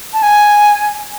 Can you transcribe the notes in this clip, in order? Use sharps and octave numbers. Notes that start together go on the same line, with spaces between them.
A5
G#5